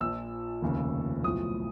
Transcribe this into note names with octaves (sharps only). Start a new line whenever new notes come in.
A#1 A#2 F3 E6
F1 D#2 C#3 F3
B1 A2 F3 D#6